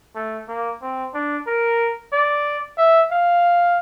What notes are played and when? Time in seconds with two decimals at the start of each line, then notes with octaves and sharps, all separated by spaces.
0.15 A3
0.48 A#3
0.82 C4
1.14 D4
1.47 A#4
2.12 D5
2.78 E5
3.11 F5